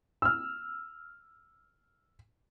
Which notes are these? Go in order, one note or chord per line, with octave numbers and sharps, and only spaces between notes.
E6 F6